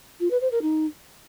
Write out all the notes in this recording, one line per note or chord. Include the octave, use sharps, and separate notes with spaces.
F4
B4
C5
A#4
D#4